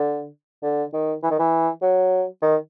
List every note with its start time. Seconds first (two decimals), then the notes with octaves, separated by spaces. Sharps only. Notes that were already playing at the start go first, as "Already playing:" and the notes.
Already playing: D3
0.62 D3
0.93 D#3
1.23 E3
1.30 D#3
1.39 E3
1.82 F#3
2.42 D#3